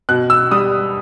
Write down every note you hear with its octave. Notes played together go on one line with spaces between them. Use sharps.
B2 F#6
E6
G3 D#6